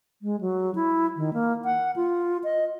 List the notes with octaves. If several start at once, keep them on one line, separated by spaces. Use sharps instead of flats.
G#3
F#3
E4
D#3
A#3
F#5
F4
D#5